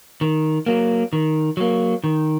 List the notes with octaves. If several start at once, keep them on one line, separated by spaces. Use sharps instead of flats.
D#3
F#3 A#3
D#3
F#3 A#3
D#3